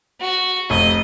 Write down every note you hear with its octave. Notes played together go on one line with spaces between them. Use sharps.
F#4
F1 D#5